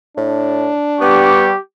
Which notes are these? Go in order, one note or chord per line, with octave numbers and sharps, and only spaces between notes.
A2 D4
G3 B3 G4 C#6 D6